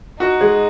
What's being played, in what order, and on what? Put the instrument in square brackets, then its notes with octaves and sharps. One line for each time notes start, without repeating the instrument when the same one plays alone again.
[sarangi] D#4 [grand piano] F#4
[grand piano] G#3